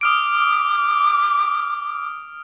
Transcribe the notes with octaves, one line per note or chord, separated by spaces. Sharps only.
D6 D#6 F6 D7